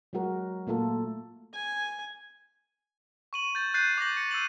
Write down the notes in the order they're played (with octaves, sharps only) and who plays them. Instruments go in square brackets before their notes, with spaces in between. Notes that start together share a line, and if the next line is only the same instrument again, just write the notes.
[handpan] F#3 G#3 F#4 A#4
A#2 A3 A#3 F4 A4
[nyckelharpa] G#5
[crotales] C#6 D#7 F#7
G6 A6
F#6 G6 A6 C7 D#7
D6 G6 A#6 F#7
C#7
E6 D#7 F#7